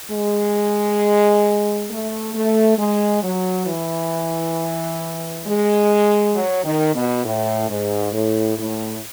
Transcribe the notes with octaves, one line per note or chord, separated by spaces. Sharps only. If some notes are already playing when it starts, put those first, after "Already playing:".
G#3
A3
A3
G#3
F#3
E3
G#3
F#3
D#3
B2
A2
G#2
A2
A2